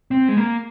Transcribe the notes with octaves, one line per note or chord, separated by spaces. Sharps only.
C4
G#3
A#3